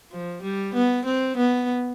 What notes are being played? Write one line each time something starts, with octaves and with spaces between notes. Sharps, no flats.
F3
G3
B3
C4
B3